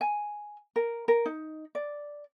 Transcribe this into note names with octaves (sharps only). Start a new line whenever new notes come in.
G#5
A#4
A#4
D#4
D5